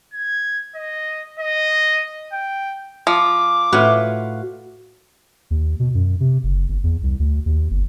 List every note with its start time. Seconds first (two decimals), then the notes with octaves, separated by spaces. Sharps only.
0.13 G#6
0.75 D#5
1.39 D#5
2.32 G5
3.07 F3 D6
3.72 A2 F4 F#4 B4 F#5
5.51 D#2
5.80 B2
5.95 F#2
6.20 C3
6.44 F#1
6.68 G1
6.84 E2
7.03 C2
7.19 D2
7.46 D#2
7.71 G1